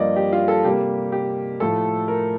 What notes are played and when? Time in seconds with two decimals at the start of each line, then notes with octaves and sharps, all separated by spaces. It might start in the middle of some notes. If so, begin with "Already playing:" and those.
Already playing: G2 F3 A#3 D5 D#5
0.16 G4
0.33 F4
0.48 A4
0.64 C3 G3 A#3 G4
1.12 G4
1.60 A2 F3 A3 A4
2.08 A#4